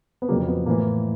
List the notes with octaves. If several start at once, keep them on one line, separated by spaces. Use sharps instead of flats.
B3
F2 C#3 F#3 A#3
B3
A2 E3 A#3